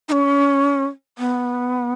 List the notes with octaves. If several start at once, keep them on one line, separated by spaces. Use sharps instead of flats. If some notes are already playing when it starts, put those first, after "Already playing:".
D#4
C#4
B3